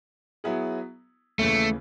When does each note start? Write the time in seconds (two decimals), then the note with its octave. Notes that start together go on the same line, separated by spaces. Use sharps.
0.44 F#3 B3 E4 G#4
1.39 D#2 C#3 E3 A3